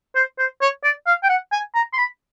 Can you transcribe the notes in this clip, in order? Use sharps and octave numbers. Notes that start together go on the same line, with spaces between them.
C5
C5
C#5
D5
F5
G5
F#5
G#5
A#5
C6
B5